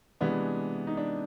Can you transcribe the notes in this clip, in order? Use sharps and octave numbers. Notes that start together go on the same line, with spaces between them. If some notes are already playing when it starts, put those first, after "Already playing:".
C3 E3 G#3 B3 D4
D#4
D4